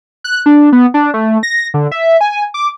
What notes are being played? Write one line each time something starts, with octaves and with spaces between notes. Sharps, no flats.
F#6
D4
B3
D4
A3
A#6
D3
E5
G#5
D6